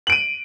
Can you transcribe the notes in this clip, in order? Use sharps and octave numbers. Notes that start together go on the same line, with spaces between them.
D7 D#7 F#7